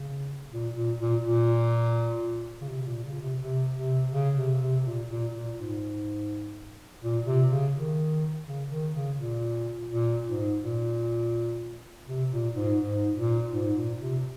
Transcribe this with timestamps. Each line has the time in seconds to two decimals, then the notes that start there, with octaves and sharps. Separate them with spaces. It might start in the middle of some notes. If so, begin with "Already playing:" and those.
Already playing: C#3
0.51 A#2
0.75 A#2
0.99 A#2
1.23 A#2
2.61 C#3
2.68 C3
2.81 C3
2.86 A#2
3.04 C#3
3.22 C3
3.40 C3
3.77 C3
4.12 C#3
4.37 C3
4.61 C3
4.85 A#2
5.09 A#2
5.33 A#2
5.57 G#2
7.02 A#2
7.26 C3
7.50 C#3
7.73 D#3
8.46 C#3
8.70 D#3
8.94 C#3
9.18 A#2
9.90 A#2
10.26 G#2
10.63 A#2
12.07 C3
12.31 A#2
12.55 G#2
12.80 G#2
13.16 A#2
13.52 G#2
13.75 A#2
14.00 C3